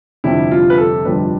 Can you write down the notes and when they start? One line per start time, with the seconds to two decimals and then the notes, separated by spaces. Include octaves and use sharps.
0.24 G1 F2 C3 G3 D4 E4
0.51 F4
0.70 B4
0.78 A4
1.05 G1 F2 C3 G3 D4 B4